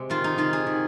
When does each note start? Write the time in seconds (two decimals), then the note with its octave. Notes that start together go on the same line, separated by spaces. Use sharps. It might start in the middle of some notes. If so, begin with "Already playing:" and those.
Already playing: C3 G#3
0.10 D#3 F4
0.24 D#4
0.38 D#3 F4
0.53 G#4
0.67 D#3